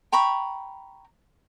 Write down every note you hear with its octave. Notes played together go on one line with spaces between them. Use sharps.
G5 A#5 B5 C#6